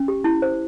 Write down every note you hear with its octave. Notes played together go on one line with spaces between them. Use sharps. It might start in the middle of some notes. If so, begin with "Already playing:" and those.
Already playing: C#4
G4
E4
C5